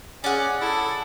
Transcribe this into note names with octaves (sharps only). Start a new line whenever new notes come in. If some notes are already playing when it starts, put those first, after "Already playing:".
C#4 G#4 D5 F#5
E4 A4